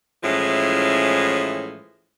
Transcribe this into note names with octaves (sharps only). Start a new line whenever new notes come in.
A2 E3 F3 G#3 C#4 E4